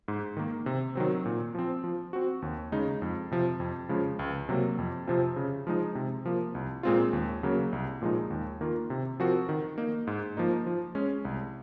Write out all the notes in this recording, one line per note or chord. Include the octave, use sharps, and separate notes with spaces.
G#2
D#3 A#3
C3
D#3 F#3 C4
A#2
F3 C4
F3
C4 F#4
D#2
C#3 G#3 D#4
F2
C3 F3
F2
C#3 F3 G#3
C#2
C3 F#3 A#3
F2
C3 F3 C4 F4
C#3
F3 G#3 D#4
C3
F3 A#3
C2
A#2 G#3 C4 F4
D#2
C#3 F#3 A#3
C2
A#2 F3 G#3 D#4
D#2
D#3 A#3 F4
C3
F3 C4 F#4 A#4
D#3
A#3 D#4
G#2
F3 A#3 D#4
F3
G#3 C#4
C2